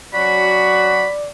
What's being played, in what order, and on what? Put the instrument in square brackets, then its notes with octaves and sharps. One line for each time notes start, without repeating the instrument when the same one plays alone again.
[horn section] F#3 C#4 F#4 [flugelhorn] D5 [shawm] B5